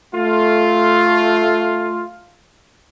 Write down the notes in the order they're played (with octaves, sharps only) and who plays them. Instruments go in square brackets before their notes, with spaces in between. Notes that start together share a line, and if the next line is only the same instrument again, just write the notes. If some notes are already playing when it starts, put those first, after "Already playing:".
[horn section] A3 F4